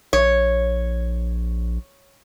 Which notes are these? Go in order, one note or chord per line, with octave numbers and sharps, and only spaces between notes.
A#1 C#5